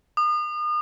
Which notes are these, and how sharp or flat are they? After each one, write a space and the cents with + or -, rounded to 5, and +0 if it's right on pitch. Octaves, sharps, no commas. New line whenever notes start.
D#6 -40